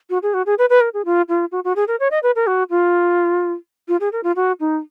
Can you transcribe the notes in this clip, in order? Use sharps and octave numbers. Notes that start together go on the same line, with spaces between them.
F#4
G#4
F#4
G#4
B4
B4
A#4
G#4
F4
F4
F#4
F#4
G#4
A#4
C#5
D#5
B4
A#4
F#4
F4
F4
G#4
A#4
F4
F#4
D#4